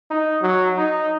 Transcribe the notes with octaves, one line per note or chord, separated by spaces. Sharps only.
D#4
F#3
D#4